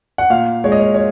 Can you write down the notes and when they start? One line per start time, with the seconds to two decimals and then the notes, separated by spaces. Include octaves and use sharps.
0.18 F#5
0.30 A#2 F5
0.64 G#3 C#5
0.72 D#5
0.80 C#5
0.94 C#5